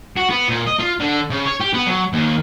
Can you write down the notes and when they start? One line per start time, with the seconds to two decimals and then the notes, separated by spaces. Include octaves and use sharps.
0.17 F#4
0.30 B3
0.49 A#2
0.67 D#5
0.79 F4
1.00 D3
1.30 C#3
1.45 C#5
1.60 G4
1.74 B3
1.87 F#3
2.13 D#2